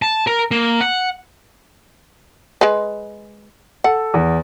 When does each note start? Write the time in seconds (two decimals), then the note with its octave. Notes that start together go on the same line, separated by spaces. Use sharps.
0.02 A5
0.27 A#4
0.51 A#3
0.81 F#5
2.61 G#3 B4
3.84 A4 F#5
4.14 E2